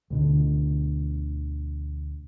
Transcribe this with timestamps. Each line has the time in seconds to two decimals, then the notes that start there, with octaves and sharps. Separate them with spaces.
0.10 D2 B2 D3